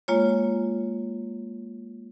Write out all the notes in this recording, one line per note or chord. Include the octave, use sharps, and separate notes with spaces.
G#3 A#3 F4 C#5